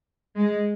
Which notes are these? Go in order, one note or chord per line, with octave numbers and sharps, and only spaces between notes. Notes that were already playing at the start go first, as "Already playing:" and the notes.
G#3